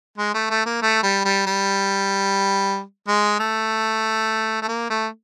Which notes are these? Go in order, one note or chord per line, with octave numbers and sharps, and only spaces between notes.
G#3
A3
A3
A#3
A3
G3
G3
G3
G#3
A3
A3
A#3
A3